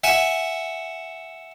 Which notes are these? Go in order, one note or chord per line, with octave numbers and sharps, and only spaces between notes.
E5 F#5 G#5